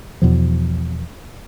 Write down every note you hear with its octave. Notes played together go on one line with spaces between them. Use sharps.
E2 B2 F3